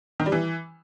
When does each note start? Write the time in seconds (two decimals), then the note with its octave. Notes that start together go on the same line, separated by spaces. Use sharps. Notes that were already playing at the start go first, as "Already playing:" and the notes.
0.20 D#3
0.26 G3
0.32 E3